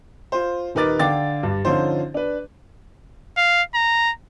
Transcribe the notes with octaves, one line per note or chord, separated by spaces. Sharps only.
F4 C5
D#1 D#4 A#4 B4 D6 A6
D3 D4 F5 G5 D6 A6
G2
D3 F3 C#4 D#4 F4 C5
D4 B4
F5
A#5